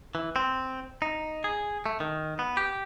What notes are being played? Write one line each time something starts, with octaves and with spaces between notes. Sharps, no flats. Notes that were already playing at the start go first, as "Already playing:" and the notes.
E3
C4
D#4
G#4
A3
D#3
B3
G4